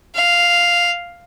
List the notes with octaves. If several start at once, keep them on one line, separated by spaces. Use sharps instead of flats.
F5